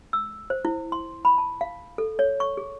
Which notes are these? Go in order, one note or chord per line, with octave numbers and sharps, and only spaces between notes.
E6
C5
E4
C6
B5
A5
F5
A4
C#5
C#6
G#4